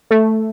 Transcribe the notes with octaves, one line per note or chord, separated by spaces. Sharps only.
A3